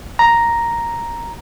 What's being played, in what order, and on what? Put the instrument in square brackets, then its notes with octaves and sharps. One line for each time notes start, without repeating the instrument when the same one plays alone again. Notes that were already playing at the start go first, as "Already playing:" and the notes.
[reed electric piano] A#5